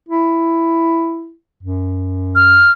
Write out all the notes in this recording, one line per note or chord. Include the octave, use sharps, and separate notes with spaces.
E4
F#2
F6